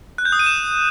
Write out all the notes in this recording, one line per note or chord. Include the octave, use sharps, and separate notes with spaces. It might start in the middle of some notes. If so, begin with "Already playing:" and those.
F#6
G6
D#6
D#7
E7